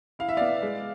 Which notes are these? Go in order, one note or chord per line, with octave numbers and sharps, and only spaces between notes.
E4 F5
E5
B3 D5 F5
G#3